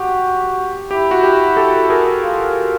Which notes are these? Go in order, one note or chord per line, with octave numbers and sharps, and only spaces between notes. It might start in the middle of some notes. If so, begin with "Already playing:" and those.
Already playing: F#4 G4
E4 G4
F#4
G4
G4 A4
G#4 A#4
F4